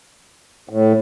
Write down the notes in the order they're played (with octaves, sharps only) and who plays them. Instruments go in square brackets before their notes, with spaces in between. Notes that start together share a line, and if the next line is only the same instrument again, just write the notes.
[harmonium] A2